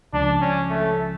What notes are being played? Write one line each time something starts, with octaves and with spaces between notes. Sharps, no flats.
C#2 C#3 F3 D4
C#4
A3